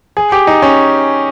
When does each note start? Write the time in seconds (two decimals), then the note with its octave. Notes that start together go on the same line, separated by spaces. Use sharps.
0.17 G#4
0.32 G4
0.47 D#4
0.62 C#4